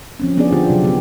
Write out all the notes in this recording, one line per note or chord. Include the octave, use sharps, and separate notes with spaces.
F3 C4 C#4
B3 C4 D4 G#4 D5
D3 F4 G4
C3 F#3
B3 G4